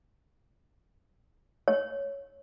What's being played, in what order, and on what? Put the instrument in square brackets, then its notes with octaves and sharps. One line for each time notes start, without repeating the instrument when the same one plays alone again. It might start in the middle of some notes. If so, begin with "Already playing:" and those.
[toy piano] C#5